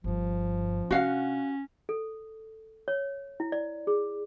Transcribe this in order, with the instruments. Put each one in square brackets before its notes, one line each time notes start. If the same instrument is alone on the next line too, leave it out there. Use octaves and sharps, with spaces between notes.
[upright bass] G1 G2 [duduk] F3
[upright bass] C3 D4 [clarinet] C#4 [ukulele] F#4 F5 F#5
[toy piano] A4
C#5
E4
D5
G#4